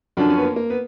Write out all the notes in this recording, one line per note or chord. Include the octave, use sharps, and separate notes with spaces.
F#2 D3 F3 D4
C#4
B3
A#3
A#3
B3